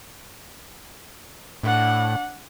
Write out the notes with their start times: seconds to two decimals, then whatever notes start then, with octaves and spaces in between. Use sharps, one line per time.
1.63 A2 D4 F#5